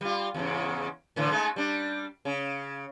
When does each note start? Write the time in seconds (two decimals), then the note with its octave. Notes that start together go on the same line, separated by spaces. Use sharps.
0.01 G3 F4
0.34 E2 G#2 C#3
1.16 A2 D3 E3
1.31 G#3 A3 D#4
1.56 G3 D4
2.25 C#3